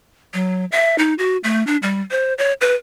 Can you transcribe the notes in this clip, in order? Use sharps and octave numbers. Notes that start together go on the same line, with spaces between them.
F#3
E5
D#4
F#4
A3
D4
G3
C5
C#5
B4